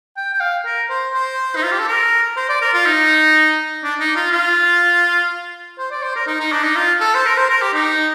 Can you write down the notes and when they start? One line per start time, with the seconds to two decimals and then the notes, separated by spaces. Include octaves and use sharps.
0.17 G5
0.33 G5
0.41 F5
0.66 A#4
0.90 C5
1.14 C5
1.56 D#4
1.63 F4
1.72 G4
1.79 A4
1.88 A#4
2.37 C5
2.49 D5
2.61 A#4
2.74 F4
2.86 D#4
3.84 D4
4.00 D#4
4.16 F4
4.32 F4
5.79 C5
5.91 D5
6.03 C5
6.16 A#4
6.27 D#4
6.40 D#4
6.52 D4
6.64 D#4
6.76 F4
7.00 A4
7.15 C5
7.26 A#4
7.38 C5
7.50 A#4
7.62 G4
7.74 D#4